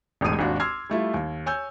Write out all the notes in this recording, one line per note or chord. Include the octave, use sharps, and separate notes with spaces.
E1 A1 G#2 D#6 D#7
G#1 D#2 D4 F#4
C6 D6 E6 F6 G#6 C7
G3 A3 E4 F4
D#2
C#5 G#5 E6 G6